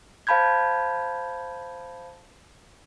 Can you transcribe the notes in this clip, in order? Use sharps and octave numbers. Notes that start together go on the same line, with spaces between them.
C5 F5 A5 B5 G6 G#6